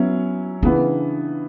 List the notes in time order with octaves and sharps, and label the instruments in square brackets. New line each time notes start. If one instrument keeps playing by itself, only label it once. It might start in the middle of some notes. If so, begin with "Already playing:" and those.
Already playing: [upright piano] F#3 C#4 E4 [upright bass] B3
[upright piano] C#3 E3 B3 [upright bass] D4